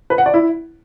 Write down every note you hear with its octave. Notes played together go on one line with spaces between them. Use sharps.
B4
F#5
D5
E4